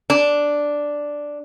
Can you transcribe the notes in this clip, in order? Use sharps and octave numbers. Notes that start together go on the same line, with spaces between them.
D4